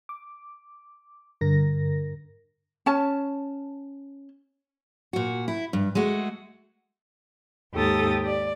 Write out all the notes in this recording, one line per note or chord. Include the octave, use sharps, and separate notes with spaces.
D6
G2 D3 A#4 A#6
C#4 A5
A#2 F#4
E4
G2
G#3 A3 F#4
D#2 G#2 G4 A4 D#6 A6
D5